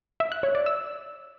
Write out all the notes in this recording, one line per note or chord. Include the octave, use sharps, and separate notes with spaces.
E5
F#6
C#5
D5
E6